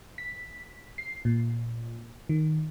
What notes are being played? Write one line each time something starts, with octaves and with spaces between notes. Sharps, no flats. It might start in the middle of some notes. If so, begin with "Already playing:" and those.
B6
C7
A#2
D#3